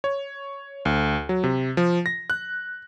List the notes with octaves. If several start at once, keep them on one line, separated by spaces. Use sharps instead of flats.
C#5
D2
F#3
C3
F3
A#6
F#6